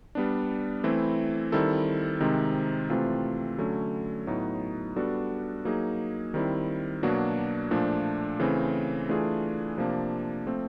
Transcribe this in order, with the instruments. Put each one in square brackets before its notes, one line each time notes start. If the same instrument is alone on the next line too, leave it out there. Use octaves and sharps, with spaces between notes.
[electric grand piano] G3 B3 D4
E3 A3 C4 E4
D#3 G3 C4 E4 A4
C3 D#3 G#3 C4 D#4
C3 E3 A3 C4 F4
D3 F#3 A3 C#4
A2 F#3 B3 D#4
G3 B3 D4 F#4 A4
F#3 A#3 D#4 G#4
D#3 G3 C4 E4
B2 F#3 A#3 D4 F#4
A#2 F3 A3 D4
C#3 E3 A3 C4
E3 A3 D4 F4 G#4
C3 F3 A#3 D4
F3 A3 C4